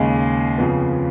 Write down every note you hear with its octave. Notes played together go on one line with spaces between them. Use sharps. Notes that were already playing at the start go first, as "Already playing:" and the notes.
Already playing: D#2 C#3 G#3
F2 C#3 F3 B3